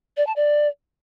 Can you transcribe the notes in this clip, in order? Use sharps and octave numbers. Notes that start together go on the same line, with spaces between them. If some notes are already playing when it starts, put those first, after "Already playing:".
D5
A5
D5